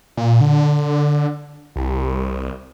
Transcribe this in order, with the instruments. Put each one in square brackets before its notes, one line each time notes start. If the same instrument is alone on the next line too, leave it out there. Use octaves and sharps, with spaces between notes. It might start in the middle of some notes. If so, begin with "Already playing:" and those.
[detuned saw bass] A#2
D3
C2